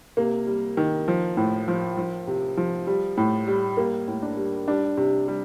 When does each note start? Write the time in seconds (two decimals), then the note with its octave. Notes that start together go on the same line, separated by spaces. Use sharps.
0.17 C3 A#3
0.47 G3
0.77 D#3
1.08 F3
1.37 A2
1.68 F3
1.97 F3
2.27 C3
2.57 F3
2.87 G3
3.17 A2
3.47 G3
3.77 G3 A#3
4.08 A2
4.22 D4
4.37 G3
4.68 G3 D4
4.97 C3
5.28 G3